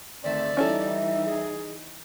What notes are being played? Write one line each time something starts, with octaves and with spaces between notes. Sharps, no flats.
D2 D#3 A3 C4 D5 E5
E3 G3 C#4 D#4 E4 A4 E5
G#4